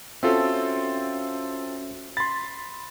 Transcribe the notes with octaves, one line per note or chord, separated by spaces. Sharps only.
C4 C#4 F4 F#4 A4 E5
B5 C6 A6